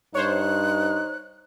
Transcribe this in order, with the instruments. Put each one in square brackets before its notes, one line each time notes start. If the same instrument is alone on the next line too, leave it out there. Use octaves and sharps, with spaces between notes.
[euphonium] G2 [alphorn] D#4 [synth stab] C5 C#5 [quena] F#6